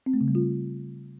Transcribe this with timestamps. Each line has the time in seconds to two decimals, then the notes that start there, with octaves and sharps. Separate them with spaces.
0.06 C4
0.14 A3
0.21 C#3
0.28 G3
0.35 F4